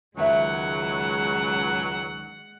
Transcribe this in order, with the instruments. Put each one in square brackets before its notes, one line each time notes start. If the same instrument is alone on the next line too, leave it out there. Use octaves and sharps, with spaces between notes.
[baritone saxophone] C#2 [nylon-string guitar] D#3 D#5 E5 [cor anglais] F#3 [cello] G#3 F#5